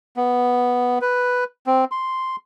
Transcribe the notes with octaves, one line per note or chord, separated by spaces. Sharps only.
B3
B4
C4
C6